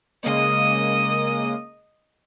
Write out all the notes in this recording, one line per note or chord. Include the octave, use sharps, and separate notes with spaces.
C#3 G#3 A#3 D#5 D#6